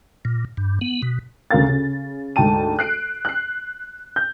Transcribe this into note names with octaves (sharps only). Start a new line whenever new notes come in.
A#2
G2
B3
B2
D2 C#3 A#4 F5 A6
C#3
D2 G#2 G5 A5 D#7
F#6 C7 D7
F#6 C7
G6